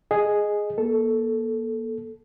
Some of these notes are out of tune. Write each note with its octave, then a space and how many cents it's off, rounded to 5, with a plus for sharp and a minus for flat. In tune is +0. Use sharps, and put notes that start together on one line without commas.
G#4 +0 D#5 -5
A#3 +35 A4 -5